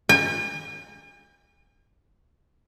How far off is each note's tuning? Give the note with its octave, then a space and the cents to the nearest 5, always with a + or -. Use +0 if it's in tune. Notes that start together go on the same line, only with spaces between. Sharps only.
G#5 -40